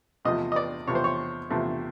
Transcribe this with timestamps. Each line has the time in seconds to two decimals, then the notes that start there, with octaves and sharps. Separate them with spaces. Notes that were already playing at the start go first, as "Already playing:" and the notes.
0.25 E2 C3 F3 A3 D#5
0.52 D#5
0.56 D5
0.87 E2 C3 F3 A3 C#5
0.95 C5
1.04 C#5
1.50 E2 C3 F3 A3